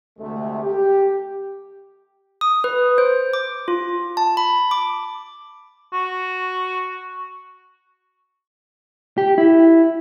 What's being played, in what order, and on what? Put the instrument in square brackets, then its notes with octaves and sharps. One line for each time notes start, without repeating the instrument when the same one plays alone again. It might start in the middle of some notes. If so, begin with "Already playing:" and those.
[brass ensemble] D2 C3 G#3 A3
G4
[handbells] D#6
B4
C5
D6
F4
A5
B5
D6
[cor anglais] F#4
[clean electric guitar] G4
E4